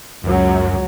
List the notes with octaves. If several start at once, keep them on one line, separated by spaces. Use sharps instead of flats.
C#2 F#2 F#3